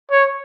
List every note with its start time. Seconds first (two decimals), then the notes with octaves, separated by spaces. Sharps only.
0.11 C#5